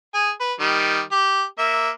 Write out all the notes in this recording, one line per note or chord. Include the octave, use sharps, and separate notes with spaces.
G#4 G#5
B4
D#3 G3
G4
A#3 E5